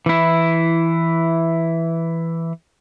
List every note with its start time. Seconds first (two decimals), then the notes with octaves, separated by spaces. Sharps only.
0.06 E3 E4